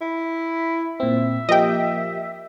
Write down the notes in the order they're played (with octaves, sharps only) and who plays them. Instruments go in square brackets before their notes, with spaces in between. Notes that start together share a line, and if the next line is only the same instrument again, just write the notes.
[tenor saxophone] E4
[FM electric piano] A#2 C4 [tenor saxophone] E5
[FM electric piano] F3 A#3 G4 [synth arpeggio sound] D#5 G5